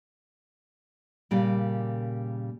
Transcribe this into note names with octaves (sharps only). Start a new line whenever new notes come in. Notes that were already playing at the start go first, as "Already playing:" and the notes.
A#2 C#3 G3 A#3